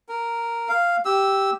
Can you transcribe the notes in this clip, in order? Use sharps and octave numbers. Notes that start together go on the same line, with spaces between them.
A#4
F5
G4 E6